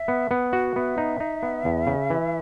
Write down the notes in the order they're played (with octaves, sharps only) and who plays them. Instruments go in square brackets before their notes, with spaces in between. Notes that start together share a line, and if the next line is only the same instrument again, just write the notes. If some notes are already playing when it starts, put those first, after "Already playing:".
Already playing: [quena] E5
[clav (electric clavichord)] B3
B3
F#4
[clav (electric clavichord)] B3 [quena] E5
[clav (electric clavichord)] D#4
D#4
B3
E2
C#3
E3